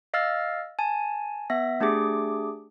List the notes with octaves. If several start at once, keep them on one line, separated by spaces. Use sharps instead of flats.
D#5 F5 E6 F6 A6
G#5 A5
B3 E5 A#6
A3 D4 G4 G#4 D6